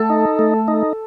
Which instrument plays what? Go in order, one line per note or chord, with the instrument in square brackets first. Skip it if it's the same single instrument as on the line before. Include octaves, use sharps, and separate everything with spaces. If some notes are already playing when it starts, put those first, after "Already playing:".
Already playing: [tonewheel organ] A3 [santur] A4
[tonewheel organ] D#4
A3
D#4